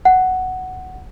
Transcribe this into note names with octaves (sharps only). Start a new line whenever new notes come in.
F#5